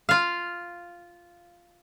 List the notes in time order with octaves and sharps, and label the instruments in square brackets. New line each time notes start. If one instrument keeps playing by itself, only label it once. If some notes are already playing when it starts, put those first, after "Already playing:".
[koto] F4 F5